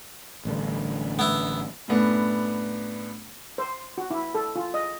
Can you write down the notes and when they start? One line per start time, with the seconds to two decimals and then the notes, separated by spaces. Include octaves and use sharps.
0.45 A1 G2 D3
1.19 B3 E4
1.88 F#2 A2 B3 D4
3.58 C5
3.98 F#4
4.10 E4
4.35 A4
4.56 F4
4.74 D#5